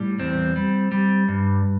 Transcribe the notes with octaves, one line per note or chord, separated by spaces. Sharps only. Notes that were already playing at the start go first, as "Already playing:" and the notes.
Already playing: A2 G3
E2 C4
G3
G3
G2